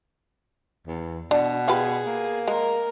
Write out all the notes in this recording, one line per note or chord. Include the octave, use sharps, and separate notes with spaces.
E2
B2 D4
F4 G4 G#4 B4
A#3
G#3 A#4